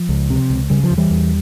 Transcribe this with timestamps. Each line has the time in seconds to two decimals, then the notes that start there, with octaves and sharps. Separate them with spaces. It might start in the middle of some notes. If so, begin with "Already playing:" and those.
Already playing: F3
0.09 C#2
0.30 C3
0.50 C#2
0.70 C#3 G3
0.83 F3
0.91 E2
0.98 E3 G3
1.10 E2